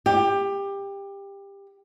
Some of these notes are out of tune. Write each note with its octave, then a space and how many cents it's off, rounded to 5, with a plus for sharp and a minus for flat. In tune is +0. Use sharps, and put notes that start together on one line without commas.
G4 +20